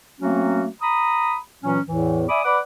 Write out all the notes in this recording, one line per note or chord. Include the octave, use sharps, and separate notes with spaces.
F#3 A3 A#3 C4 C#4 F#4
A#5 B5 D#6
A#2 E3 F#3 C#4
E2 A2 E3
D5 E5 G#5 B5 D6 D#6
B4 D5 F#5 B5 D6